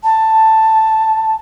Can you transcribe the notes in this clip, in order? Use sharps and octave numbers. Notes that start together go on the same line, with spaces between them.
A5